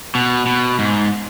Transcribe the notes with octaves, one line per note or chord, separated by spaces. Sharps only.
B2
B2
G#2